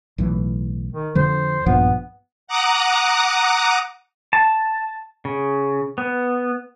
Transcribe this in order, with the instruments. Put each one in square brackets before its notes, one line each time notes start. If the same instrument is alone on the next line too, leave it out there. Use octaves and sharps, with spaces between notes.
[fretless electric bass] B1 A2 E3
[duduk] D#3
[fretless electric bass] F2 D3 F3 [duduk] C5
[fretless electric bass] A#1 G2 F3 [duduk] B3
[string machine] F#5 A#5 D6 D#6 F#6
[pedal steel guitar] A5
C#3
B3